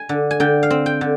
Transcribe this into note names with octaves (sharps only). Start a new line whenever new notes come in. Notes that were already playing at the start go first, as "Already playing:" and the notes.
Already playing: G#5
D3
G#5
D3 G5
F5
C4
G5
D3